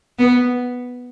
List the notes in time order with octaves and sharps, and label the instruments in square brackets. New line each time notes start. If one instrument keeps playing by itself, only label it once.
[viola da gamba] B3